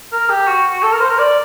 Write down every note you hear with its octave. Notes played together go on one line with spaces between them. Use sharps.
A#4
G4
F#4
F#4
A4
A#4
C5
A#4
D5